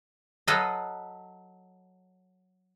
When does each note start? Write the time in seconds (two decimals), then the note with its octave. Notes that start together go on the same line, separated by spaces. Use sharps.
0.47 F#3 A4 B4 D#5 F5 A#5